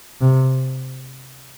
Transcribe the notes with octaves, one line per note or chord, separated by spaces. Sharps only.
C3